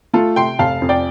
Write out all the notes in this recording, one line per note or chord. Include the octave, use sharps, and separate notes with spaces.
A3 F4 A4
C3 G5 C6
F1 F5 A5
F2
D5 G5